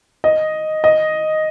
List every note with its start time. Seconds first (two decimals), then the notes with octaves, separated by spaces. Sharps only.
0.24 D#5
0.84 D#5